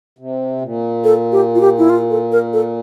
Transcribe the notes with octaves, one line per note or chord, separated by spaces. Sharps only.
C3
A#2
A4
G4
F4
G4
E4
F4
A4
A#4
A4